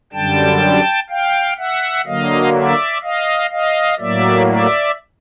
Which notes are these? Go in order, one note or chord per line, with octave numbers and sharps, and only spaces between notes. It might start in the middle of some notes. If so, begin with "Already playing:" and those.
F#2 D3 G3 G5 A5
F5 G5
E5 F#5
D3 F#3 A#3 D#5 F5
D5 E5
D#5 F5
D#5 F5
A2 F#3 A#3 D5 E5
D5 E5